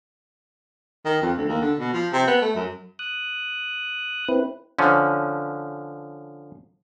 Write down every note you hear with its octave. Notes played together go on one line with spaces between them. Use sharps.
D#3
F2
D2
D#2
D3
B2
F3
C3
B3
A3
F#2
D#6 F#6
C4 E4 B4
D3 F3 C#4